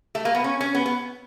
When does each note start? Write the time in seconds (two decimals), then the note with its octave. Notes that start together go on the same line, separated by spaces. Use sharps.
0.15 A3
0.25 A#3
0.35 B3
0.44 C#4
0.61 C#4
0.75 B3
0.86 B3